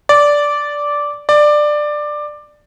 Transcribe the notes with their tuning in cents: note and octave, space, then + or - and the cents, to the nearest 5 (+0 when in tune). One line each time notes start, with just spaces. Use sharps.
D5 -10
D5 +15